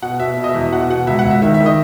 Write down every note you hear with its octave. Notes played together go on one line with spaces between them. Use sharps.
B2 F#5
B2 E5
B2
D#5
E5
E2
E5
B2 F#5
B2 F#5
C#2 E5
F#5
C#2
E5
D#3 E5
E5
D#3
D#5